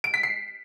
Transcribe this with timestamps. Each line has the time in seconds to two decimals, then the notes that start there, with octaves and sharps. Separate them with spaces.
0.04 D7
0.14 B6
0.23 C7